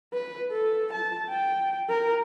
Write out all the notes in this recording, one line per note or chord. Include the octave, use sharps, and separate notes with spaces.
B4
A4
A5
G5
A#4